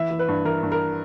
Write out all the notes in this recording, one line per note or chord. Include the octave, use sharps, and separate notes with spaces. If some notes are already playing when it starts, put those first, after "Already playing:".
Already playing: E3 E5
E3
B4
G2
E3 A#4
G2
A#4